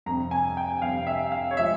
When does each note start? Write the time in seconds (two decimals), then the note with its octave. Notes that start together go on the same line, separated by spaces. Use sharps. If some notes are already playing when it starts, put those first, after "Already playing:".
0.06 F2 C3 G3 A#5
0.31 G#5
0.57 G5
0.82 F2 C3 G3 F5
1.07 E5
1.32 F5
1.51 C#5
1.57 F3 G#3 E5